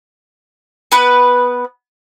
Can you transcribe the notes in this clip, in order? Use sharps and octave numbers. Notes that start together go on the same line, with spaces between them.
B3 B4